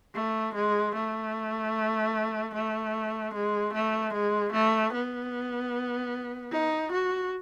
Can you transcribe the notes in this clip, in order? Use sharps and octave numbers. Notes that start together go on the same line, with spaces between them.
A3
G#3
A3
A3
G#3
A3
G#3
A3
B3
D#4
F#4